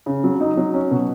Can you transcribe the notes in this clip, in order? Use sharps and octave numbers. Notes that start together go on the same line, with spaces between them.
C#3
F#3
D#4
F#3
C#4
B2